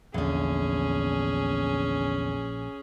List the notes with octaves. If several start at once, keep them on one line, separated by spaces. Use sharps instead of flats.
A#1 E2 D3 C#4 G#4